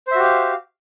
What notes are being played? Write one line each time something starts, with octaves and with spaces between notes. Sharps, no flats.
F#4 G4 C5 E5 F5